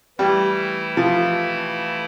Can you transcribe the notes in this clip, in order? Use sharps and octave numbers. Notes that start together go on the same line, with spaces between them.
E3 G3 A3 E4
F3